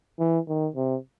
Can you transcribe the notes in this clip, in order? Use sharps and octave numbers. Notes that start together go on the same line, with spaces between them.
E3
D#3
C3